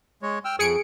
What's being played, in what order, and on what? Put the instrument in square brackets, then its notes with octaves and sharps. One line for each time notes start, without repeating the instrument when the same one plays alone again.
[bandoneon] G#3 C#5
G5 E6 F6
[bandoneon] F2 [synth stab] G#4 C#7 D7